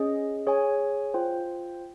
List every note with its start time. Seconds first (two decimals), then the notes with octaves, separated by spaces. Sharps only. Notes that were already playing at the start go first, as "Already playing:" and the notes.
Already playing: C#4 G#4 D#5
0.47 G#4 C#5 G#5
1.14 F4 C5 G5